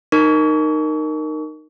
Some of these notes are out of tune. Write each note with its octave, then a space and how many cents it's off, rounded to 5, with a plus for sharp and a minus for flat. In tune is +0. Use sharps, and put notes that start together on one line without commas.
D#4 -15 A#4 +0 C#6 +35